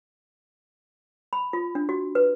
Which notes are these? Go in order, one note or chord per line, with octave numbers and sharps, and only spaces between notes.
B5
F4
D4
F#4
B4